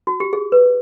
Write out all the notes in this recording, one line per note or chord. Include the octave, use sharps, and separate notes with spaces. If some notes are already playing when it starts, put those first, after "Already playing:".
F#4
G4
G#4
B4